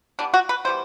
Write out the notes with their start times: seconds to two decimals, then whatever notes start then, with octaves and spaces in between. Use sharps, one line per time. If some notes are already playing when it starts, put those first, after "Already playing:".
0.19 E3 G3 B3 D4
0.34 F#4
0.49 B4
0.65 E3 G3 B3 C5